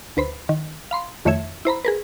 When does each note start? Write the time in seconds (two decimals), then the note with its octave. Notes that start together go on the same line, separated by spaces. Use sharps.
0.17 D2 B4 C5 B5
0.49 D#3
0.91 F5 B5 C6
1.25 F2 D#3 A3 C#5 E5 G#6
1.65 E4 C5 A#5 B5
1.85 G#4 A#4 B4